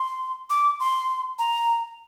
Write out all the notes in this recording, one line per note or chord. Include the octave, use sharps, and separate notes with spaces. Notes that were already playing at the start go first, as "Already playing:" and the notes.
Already playing: C6
D6
C6
A#5